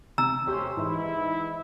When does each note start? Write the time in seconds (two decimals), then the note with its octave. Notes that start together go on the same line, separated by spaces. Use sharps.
0.18 C3 A#5 E6
0.47 A3 C#4 G4 C5
0.77 G#2 E3 E4